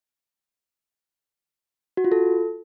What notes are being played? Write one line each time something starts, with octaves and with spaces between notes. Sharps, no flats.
F#4
F4
A4